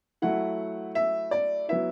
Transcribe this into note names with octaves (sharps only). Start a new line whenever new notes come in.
F#3 A3 E4 F#5
E5
D5
F#3 B3 E4 E5